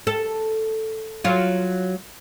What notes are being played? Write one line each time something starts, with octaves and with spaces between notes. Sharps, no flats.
A4
F#3 F4